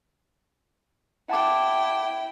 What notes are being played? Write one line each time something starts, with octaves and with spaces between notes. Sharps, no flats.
E4 F#5 G5 A5 D6